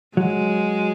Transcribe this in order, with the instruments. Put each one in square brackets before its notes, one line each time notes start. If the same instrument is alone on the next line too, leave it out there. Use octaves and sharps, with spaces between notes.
[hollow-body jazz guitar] F#3 [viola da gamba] G#3